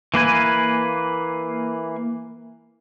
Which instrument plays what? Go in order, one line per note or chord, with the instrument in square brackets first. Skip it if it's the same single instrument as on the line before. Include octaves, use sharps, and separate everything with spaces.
[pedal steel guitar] E3 A#3 B4 G#5